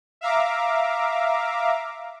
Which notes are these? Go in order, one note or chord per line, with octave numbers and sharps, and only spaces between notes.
E5 F5 A#5 D6